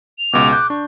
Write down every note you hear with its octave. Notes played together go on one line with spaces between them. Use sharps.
F7
C#2 B2 D6
F#6 G6
D4 C#6